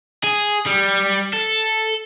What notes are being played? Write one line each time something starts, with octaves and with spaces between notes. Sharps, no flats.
G#4
G3
A4